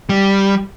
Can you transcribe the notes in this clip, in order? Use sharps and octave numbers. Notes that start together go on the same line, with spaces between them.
G3